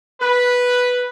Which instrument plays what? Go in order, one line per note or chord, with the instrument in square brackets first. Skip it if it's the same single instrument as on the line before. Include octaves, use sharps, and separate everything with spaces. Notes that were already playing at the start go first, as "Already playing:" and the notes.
[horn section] B4